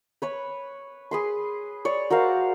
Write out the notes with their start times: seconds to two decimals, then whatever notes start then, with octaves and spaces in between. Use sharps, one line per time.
0.22 B4 C#5 B5
1.11 G#4 B4 C6
1.85 C#5 D5
2.10 F#4 A#4 C5 F5